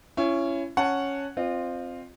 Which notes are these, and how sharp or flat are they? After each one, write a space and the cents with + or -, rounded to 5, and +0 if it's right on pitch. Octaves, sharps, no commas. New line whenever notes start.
C#4 +0 E4 +35
C#4 +0 F#5 +0 A5 +15
C4 +0 F4 +0 D#5 -35